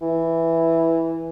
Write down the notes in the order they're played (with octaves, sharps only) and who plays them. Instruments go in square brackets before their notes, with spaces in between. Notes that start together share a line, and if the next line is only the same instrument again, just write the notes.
[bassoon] E3